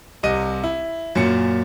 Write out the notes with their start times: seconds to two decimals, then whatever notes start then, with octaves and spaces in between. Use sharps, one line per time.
0.23 C2 C3 D#5 D#7
0.64 E4
1.15 F#2 A#2 C#4 C#7